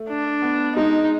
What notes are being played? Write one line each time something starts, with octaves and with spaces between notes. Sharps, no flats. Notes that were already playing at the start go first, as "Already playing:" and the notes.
Already playing: A3
D4
B3
G#3 D#4